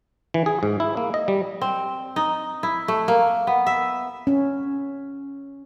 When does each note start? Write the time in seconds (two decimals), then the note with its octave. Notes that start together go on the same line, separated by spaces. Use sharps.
0.34 E3
0.46 G#4
0.63 G#2
0.80 E4
0.97 A#3
1.14 D#5
1.28 G3
1.61 C4
2.16 D#4
2.63 E4
2.88 A3
3.08 A#3
3.47 B3
3.67 E5
4.27 C#4